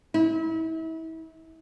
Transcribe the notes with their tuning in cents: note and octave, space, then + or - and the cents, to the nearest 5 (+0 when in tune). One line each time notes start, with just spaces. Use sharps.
E4 -35